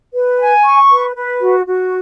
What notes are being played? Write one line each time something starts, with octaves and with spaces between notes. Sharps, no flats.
B4
G#5
C#6
B4
B4
F#4
F#4